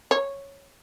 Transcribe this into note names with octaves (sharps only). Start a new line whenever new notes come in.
C#5